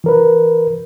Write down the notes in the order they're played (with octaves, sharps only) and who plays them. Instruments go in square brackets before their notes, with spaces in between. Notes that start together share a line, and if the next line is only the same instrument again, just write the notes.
[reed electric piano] E3 A#4 B4